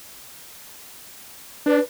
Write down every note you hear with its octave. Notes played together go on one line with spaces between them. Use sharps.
D4 B4